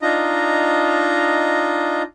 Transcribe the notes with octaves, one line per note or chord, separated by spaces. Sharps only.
D4 D#4 F4 D#5 A#5